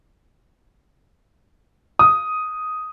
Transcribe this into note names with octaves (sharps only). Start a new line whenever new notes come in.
D#6